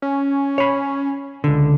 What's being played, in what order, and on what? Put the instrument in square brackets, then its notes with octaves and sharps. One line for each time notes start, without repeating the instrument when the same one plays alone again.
[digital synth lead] C#4
[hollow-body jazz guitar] C#5 B5
C#2 D3